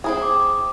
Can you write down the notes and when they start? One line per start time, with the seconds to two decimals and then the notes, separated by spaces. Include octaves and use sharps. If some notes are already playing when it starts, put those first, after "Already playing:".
0.04 C4 E4 G#4 D#6
0.22 D6